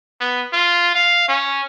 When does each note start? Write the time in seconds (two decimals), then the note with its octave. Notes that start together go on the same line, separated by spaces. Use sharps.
0.21 B3
0.53 F4
0.96 F5
1.29 C#4